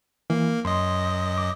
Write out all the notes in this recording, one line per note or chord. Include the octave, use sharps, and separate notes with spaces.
E3 A#3
F#2 D#5 C6
D6